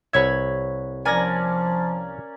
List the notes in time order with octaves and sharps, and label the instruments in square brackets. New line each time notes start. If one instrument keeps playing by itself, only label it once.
[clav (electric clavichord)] C2 E5 [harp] B4 C#5 G#6
[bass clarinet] F3 [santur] A#3 C#4 D5 [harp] G#5 A#6